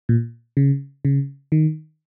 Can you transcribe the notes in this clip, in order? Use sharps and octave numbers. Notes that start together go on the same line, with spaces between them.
A#2
C#3
C#3
D#3